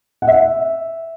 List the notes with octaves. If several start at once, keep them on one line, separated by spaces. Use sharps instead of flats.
F#5
E5